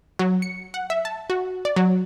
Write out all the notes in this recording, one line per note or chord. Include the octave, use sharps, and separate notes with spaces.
F#3
C#7
F#5
E5
A5
F#4
D5
F#3